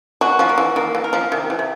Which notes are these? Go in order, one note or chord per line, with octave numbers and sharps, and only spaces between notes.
F#3 F#4
F3
A#3
E3
D#3 A#3
E3
A#4
F3
C3 D#3
E3
C3